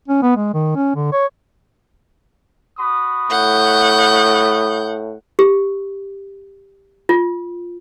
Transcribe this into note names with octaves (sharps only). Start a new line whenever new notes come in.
C#4
B3
G#3
D#3
C#4
D3
C#5
F#4 B5 D#6
A2 F#5 G6
G4
F4